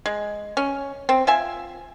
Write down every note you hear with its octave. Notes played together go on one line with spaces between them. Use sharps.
G#3
C#4
C4
F4 E5 G#5